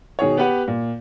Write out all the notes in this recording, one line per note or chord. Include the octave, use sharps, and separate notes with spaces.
B2 D#3 G#4 C#5
B3 G4 B4 F#5
A#2